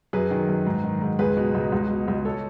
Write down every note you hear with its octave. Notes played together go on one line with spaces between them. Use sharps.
F#2 G#4 B4
D#3
F#2
G#2
D#3
G#2
C#2 G#4 B4
B2
C#2
C#2
B2
C#2
A4 C#5